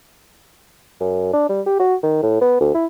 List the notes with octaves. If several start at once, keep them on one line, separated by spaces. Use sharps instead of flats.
F#2
D4
G3
G4
F#4
D#3
A2
B3
D2
E4